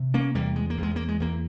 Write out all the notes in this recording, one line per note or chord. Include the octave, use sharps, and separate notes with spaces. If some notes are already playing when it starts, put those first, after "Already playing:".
Already playing: C3
A#3 C#4
E2 G3 A#3
G#3
A#3
E2
G#3
A#3
G#3
E2 A#3